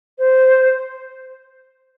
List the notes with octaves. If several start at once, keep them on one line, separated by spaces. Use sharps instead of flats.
C5